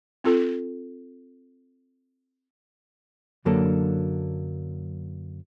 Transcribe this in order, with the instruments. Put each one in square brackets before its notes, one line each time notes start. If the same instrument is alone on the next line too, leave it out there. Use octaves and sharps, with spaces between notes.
[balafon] C4 F4 A4
[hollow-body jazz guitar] F#2 D3 F#3 A#3 D4 A4